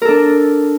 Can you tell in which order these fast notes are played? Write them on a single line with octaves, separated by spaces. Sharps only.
A#4 A4 D4